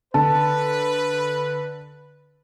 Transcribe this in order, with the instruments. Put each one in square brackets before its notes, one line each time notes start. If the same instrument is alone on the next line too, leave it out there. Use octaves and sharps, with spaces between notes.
[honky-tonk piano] D3 [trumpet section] B4 [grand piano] A5